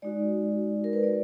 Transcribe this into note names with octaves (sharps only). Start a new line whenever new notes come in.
G#3 D#4 F#4 D5
A#4
B4
D5